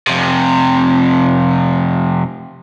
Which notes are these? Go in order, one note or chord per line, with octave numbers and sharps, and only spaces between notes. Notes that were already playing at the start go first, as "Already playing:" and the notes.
F2 C3